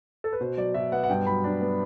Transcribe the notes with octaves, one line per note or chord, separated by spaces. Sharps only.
A4
B4
B2 C5
F#3 D5
B2 E5
B3 F#5
F#5
G2 G5
F#3 B5
D4
B3